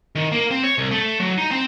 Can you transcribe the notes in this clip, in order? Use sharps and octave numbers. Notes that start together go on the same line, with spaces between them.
D#3
A#3
C4
C#5
C2
A3
F#3
D#4
C4